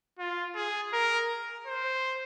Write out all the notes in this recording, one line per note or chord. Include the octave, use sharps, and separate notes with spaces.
F4
G#4
A#4
C5